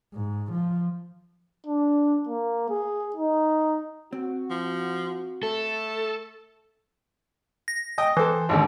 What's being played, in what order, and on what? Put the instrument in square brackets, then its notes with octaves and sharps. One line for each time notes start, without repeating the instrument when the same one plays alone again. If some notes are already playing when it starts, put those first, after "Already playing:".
[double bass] G#2
F3
[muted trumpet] D4
A#3
G#4
D#4
[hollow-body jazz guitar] C4 [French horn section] F#4
[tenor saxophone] F3
[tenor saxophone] A3 [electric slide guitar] A4
[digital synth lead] A#6
[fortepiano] D#5 G5 D#6
[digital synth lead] E3 [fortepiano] A4 C5
[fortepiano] G#1 D#2 D3